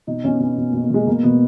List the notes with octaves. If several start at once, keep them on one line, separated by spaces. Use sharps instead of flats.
B2 D#4
B2 C#4
B3
B2 C#4
B2 B3
A#3
B2
A#3
B2 G#3
B2 A#3
B2 B3